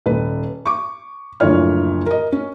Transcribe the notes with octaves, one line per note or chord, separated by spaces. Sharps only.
D#1 B4
C#6 D6
F#1 D2 A2 F3 C#5 F6
A#4 D#5
C#4